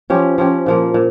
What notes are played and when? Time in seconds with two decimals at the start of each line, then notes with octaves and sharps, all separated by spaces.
0.10 F3 C#4 G4
0.38 F3 C#4 G4
0.66 A#2 F3 A#3
0.94 A#2